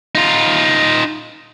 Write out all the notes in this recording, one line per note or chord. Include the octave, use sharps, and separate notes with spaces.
D#4 F4